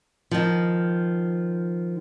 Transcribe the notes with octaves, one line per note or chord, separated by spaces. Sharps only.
D#3 F3